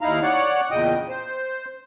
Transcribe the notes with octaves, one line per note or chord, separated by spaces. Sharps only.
D#2 D#4 E4 F5 A#5
C#5 D5 F#5
E2 A#2 C#3 D#5 G5 D#6
C5